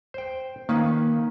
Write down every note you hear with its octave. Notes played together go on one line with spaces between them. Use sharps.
C5 G5
D#3 A#3 C#4 B4